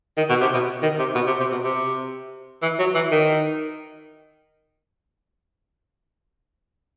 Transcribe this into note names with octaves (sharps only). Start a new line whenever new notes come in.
D#3
B2
C3
B2
D#3
C3
B2
C3
C3
B2
C3
E3
F#3
E3
D#3